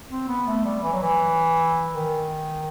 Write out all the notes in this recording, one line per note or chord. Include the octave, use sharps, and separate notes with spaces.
C4
B3
A3
G3
E3
F#3
E3
D#3